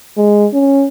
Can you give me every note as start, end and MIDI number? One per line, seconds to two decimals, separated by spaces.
0.17 0.47 56
0.53 0.88 61